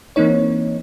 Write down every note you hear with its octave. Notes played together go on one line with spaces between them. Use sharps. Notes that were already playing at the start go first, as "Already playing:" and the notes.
E3 A#3 C4 D#4 C#5